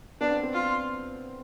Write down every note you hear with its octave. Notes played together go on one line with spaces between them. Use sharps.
B3 D4
C4
C4
F4